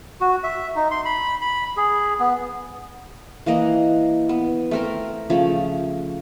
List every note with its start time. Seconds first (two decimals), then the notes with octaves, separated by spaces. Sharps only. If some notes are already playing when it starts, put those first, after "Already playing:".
0.21 F#4
0.44 E5
0.76 D#4
0.91 C6
1.05 B5
1.41 B5
1.77 G#4
2.20 B3
3.46 E3 A#3 D#5 F#5
4.29 B3
4.71 A3 C4 A#4
5.30 C#3 F3 A3